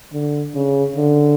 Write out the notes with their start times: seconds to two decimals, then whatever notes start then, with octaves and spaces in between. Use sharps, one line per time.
0.13 D3
0.54 C#3
0.96 D3